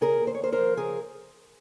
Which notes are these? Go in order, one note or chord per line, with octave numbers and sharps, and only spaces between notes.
C#3 G#4 A#4
D#2
C5
C#5
D#2 A#4 C5
A#4 C5
F3
C#3 G#4 A#4